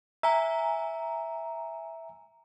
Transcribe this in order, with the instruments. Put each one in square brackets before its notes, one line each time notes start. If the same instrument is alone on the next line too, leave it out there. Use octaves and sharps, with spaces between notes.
[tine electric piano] E5 [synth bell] G#5 A#5